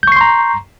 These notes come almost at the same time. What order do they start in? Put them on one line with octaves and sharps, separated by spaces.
G6 C#6 C7 C6 A#5